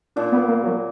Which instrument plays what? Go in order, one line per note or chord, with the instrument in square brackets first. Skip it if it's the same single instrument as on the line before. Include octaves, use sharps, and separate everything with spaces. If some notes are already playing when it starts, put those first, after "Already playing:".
[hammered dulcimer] A#2 [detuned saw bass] D4
[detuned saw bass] B3
A#3
F#3